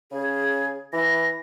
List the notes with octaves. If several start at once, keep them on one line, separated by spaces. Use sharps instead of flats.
C#3 G#4
E3 A#6